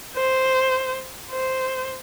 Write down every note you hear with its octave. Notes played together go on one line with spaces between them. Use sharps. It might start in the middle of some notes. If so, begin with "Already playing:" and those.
C5
C5